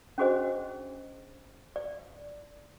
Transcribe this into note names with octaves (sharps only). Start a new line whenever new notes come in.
C#4 D4 F#4 G#4 C5 D#5
D5